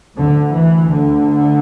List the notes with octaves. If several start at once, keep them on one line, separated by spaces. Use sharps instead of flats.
D2 D3
E3
D3